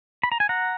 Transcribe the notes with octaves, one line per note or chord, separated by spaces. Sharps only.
B5
A#5
G#5
F#5 A#5